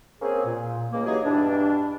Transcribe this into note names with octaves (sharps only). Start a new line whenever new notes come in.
A#3 C4 C#4 G#4
A#2
C#2 A#3
E3 F#3 D#4 G4 G#4
G2 B2 E3 D4